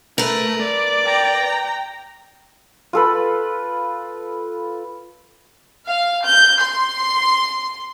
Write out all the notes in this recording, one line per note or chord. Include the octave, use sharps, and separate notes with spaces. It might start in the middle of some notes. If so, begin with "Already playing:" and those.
A3 A#4 B4
D5
G5 A#5
F4 A4 B4
F5
G6
C6